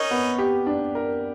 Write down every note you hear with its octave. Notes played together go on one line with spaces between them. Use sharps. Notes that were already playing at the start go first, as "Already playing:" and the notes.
Already playing: C#4 D#4 A#4
B3
G4
D4
A#4